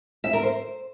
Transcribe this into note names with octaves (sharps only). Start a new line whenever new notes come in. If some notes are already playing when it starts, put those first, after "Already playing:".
E5
A#4
C5